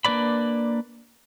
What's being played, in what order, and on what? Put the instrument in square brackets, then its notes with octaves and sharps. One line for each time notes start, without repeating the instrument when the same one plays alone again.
[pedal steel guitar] A#3 D4 B4 D5 B5